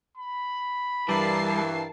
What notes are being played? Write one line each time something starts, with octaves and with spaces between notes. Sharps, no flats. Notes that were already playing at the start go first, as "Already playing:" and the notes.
B5
G2 E3 G3 A#4 A5 C7